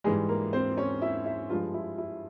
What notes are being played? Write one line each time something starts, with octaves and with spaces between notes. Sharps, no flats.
G#2 E3 G3 G#3 G#4
A#3 A#4
C4 C5
C#4 C#5
E4 E5
E4 E5
G2 F3 G#3 F4
E4
E4